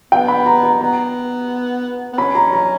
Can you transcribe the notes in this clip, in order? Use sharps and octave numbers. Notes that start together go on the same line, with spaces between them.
B3 G5
B5
A#5
A#5
B3 A#5
B3
C#4 B5
A#5
A#5